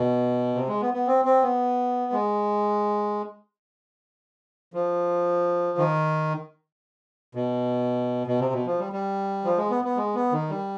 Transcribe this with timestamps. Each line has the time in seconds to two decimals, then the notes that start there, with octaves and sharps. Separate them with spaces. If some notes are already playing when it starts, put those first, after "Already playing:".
Already playing: B2
0.55 C3
0.68 G#3
0.81 B3
0.94 B3
1.07 C4
1.25 C4
1.42 B3
2.12 G#3
4.74 F3
5.78 D#3
7.35 B2
8.27 B2
8.40 C3
8.53 B2
8.66 F3
8.79 G3
8.93 G3
9.45 F3
9.57 G#3
9.70 B3
9.84 B3
9.97 G#3
10.15 B3
10.32 D#3
10.50 G3